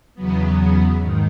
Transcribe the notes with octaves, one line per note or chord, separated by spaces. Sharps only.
E2 C#3 F#3 B3
G#2 D#3